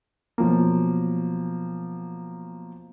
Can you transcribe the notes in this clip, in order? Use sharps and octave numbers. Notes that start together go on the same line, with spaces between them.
B2 F3 F#3 A#3